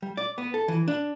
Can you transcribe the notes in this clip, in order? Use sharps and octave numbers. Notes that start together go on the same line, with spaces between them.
G3
D5
B3
A4
E3
D4